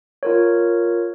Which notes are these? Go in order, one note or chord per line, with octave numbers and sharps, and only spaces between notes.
F4 A#4 C#5